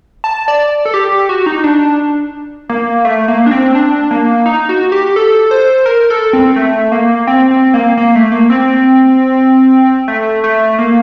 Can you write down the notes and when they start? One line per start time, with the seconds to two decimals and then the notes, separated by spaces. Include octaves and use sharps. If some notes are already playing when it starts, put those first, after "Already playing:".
0.24 A5
0.48 D5
0.85 A4
0.94 G4
1.12 G4
1.29 F#4
1.46 D#4
1.64 D4
2.69 A#3
3.05 A3
3.28 A#3
3.46 D4
3.51 C4
3.75 D4
4.11 A#3
4.46 D#4
4.69 F#4
4.92 G4
5.16 A4
5.51 C5
5.86 A#4
6.10 A4
6.33 C4
6.56 A3
6.92 A#3
7.27 C4
7.51 C4
7.74 A#3
7.97 A#3
8.15 A3
8.32 A#3
8.50 C4
10.08 A3
10.44 A3
10.79 A#3